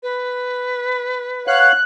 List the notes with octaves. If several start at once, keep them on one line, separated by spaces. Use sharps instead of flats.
B4
C#5 F5 F#5 F#6